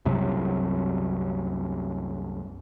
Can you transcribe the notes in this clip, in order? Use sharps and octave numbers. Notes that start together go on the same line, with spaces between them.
C2 F#2 C3 F#3